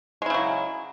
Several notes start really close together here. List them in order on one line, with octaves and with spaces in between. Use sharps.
G#3 E4 C#3 F#3